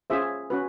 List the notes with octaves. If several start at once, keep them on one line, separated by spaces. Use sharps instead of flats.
C#4 F4 G#4 C5 E5
C#4 F#4 B4